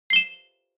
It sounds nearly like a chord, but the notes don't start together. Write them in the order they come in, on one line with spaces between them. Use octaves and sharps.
C7 G7 E7